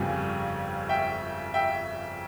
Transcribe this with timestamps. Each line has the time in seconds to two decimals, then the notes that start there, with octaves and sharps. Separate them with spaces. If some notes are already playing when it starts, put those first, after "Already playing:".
Already playing: G1 F2 C#3 G3 G#5
0.89 E5 G5
1.54 E5 G5